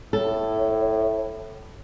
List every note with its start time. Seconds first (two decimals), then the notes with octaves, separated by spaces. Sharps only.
0.13 A2 A4 C#5